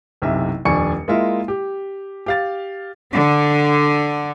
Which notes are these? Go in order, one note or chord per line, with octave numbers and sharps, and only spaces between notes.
F#1 B1 C3 E5
D#1 F2 D4 G#5 C#6 C#7
G#3 A#3 E4 F4 E5
G4
G4 F5 A6
D3